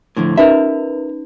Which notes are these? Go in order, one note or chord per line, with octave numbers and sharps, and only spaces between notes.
A2 D3 F3
C#4 D#4 A#4 B4 E5